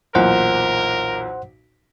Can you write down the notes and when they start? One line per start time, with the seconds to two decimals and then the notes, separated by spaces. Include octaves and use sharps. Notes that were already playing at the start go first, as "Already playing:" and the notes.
0.15 B1 E2 A#2 A#4 C5 F#5